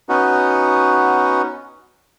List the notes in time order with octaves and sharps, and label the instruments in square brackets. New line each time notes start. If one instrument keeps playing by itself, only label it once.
[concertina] B3 C#4 D#4 F#4